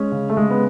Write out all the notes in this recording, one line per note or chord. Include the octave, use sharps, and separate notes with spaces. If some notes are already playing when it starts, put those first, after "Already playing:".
Already playing: G#3 C#4
C#3
A3
G#3
B3